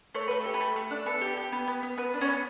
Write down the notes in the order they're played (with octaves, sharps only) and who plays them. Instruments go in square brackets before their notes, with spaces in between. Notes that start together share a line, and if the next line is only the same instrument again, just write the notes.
[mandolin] A3 C#5
A3 B4
G4 A4
B4
A3
A3
D4
B3 A4
G4
G4
B3
B3
B3
B3 B4
D4
C#4 C#5
B3